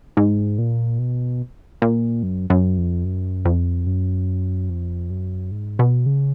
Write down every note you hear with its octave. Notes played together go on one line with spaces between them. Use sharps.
G#2
A#2
B2
A#2
F#2
F#2
F2
F#2
F2
F#2
F2
F#2
G#2
B2
C#3